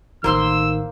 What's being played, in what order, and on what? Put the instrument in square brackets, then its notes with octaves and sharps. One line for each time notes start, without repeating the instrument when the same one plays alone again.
[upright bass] A1 [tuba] D#3 [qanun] A#3 C5 C6 [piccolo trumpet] E6